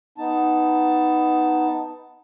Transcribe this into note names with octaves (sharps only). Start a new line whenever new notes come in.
B3 D#4 A5